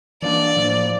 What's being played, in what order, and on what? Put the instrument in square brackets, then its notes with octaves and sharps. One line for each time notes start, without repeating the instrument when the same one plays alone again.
[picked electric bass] E3 A#3 D4 [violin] D5
[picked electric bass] A2 F3 A#3